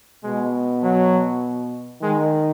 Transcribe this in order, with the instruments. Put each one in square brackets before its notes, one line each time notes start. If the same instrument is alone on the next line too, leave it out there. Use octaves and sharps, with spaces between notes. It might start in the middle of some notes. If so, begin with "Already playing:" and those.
[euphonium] B2 [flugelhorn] G#3
[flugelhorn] F#3
[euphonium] D#3 [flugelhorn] G#3